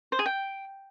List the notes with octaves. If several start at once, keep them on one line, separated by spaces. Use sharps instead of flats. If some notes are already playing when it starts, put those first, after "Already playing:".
C5
G#4
G5